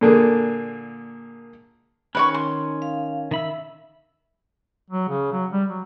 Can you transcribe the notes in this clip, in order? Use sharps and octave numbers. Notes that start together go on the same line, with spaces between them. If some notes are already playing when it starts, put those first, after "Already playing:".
A#2 D3 A#3 G#4
D#3 C#4 B4 C#5 C#6
C6
F5
D#3 E5 B5 E6
F#3
C#3
F#3
G3
F#3